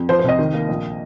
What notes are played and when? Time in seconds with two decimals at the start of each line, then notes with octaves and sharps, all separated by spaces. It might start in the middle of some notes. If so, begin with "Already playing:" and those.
Already playing: F2
0.09 F3 C5
0.19 C5
0.24 C2 D#5
0.39 D#3
0.54 A#3
0.69 A#1